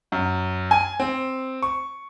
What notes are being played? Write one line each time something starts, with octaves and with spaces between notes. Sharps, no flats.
F#2
G#5
C4
C#6